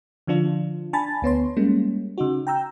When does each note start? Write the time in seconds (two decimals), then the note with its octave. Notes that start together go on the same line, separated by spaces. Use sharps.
0.27 D3 F3 D4 F4
0.93 D4 G#5 A5 B5 A6
1.22 D2 B3 C#5 C6
1.57 G3 G#3 A#3 C#4
2.18 C#3 D#4 F#4
2.47 G5 A#5 E6 G6